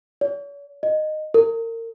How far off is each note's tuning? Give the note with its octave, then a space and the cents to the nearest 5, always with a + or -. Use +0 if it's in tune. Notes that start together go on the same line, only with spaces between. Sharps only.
C#5 +45
D#5 -10
A#4 -35